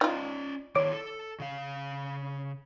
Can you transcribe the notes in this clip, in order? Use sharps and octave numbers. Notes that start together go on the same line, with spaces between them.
C#4 D#4 F4 D5
D#3 E4 G#4 C#5 D6 D7
A4
C#3 F5